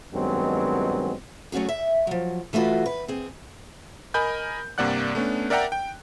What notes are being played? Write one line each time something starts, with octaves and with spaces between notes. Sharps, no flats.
G2 D#3 F#3 G#3 B3 C4
F#3 A3 C#4 F#4 G#4
E5
F3 F#3
E3 A3 F4 F#4 B4
B4
C4 G#4
A#4 D#5 G#5 B5 G6
G2 C3 A#3 D5 F#5 F#6
A3 B3 C#4 D4
A#4 D5 E5 F#5 G5 A#5
G5